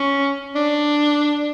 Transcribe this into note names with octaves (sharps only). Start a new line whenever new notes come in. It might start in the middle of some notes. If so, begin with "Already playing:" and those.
Already playing: C#4
D4